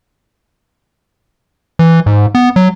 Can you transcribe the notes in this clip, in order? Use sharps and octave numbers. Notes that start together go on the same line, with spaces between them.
E3
G#2
B3
F#3